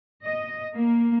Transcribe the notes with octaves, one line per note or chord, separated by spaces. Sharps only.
D#5
A#3